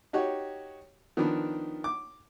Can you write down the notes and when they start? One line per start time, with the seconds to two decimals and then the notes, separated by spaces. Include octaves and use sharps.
0.13 D#4 F#4 G4 C#5
1.17 D#3 F3 B3 D4
1.84 D6